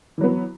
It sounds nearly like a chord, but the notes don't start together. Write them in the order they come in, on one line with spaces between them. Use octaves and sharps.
E3 F#3 B3